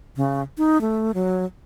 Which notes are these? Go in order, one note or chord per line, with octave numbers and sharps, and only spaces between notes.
C#3
D#4
A3
F#3